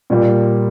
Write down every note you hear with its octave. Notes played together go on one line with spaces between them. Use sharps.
A#2 G3 A#3